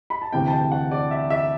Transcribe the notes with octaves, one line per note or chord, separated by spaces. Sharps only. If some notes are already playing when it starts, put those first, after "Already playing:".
B5
A5
D2 C3 E3 G5
A5
G5
F#5
D5
E5
E5